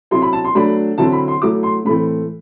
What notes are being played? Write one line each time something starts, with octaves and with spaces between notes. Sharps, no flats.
F#3 C4 E4 C6
B5
A5
C6
F#3 A3 D4 B5
D3 F#3 C4 E4 A5
B5
C6
F#3 A3 E4 D6
C6
A2 E3 A3 C4 B5